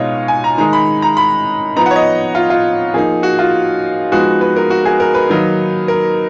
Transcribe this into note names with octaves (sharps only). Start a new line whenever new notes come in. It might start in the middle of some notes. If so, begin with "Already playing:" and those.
Already playing: B2 G#3 B3 D#4 F4 C#5 D#5
G#5
A#5
D#3 G#3 D#4 A#5
B5
A#5
B5
F3 B3 D#4 A#5
F#5
C#5
D#5
F4
F4
F3 A#3 D#4 G#4
F#4
F4
F3 G#3 B3 D#4 F#4
B4
A#4
F#4
G#4
A#4
B4
D#3 F#3 A#3 D#4
A#4